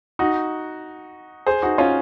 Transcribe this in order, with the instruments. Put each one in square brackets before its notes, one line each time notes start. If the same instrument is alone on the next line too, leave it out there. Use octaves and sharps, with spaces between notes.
[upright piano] D#4 F#4
G#4 C5
D#4 F#4
C#4 F4